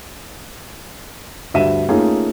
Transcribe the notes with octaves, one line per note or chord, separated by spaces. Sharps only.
D2 G2 E5 D#7
A3 A#3 C#4 D#4 F4 G#4